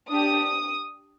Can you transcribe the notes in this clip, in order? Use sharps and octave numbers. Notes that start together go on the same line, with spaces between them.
D4 G4 D#6